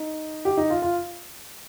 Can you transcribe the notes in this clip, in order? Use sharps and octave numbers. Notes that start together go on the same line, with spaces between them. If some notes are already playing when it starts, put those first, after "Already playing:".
Already playing: D#4
G4
D#4
F4
F4